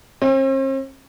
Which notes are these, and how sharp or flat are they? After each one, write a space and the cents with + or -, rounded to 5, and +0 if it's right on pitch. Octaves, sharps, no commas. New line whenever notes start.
C4 +45